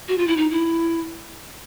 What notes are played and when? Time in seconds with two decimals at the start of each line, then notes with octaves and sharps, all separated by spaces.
0.08 F#4
0.18 F4
0.27 E4
0.37 D#4
0.51 E4